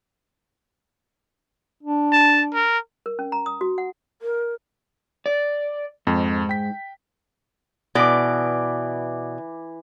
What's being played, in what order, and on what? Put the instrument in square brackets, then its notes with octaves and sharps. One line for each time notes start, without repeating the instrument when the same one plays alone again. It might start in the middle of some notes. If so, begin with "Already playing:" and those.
[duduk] D4
[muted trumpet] A5
A#4
[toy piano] A#4
C#4
A#5
D#6
F#4
F#5
[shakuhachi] A#4
[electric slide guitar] D5
[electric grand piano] F2 [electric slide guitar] G#2
[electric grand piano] G5 B6
[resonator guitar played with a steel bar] B2 D5 [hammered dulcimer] E3 D6